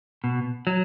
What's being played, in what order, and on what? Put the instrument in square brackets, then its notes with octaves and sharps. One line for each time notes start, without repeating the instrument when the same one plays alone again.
[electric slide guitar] B2
F#3